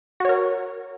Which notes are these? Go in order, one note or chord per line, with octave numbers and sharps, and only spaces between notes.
F#4 A#4 C#5